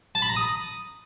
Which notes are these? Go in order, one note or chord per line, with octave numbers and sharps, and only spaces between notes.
A5
B5
A#5
D#6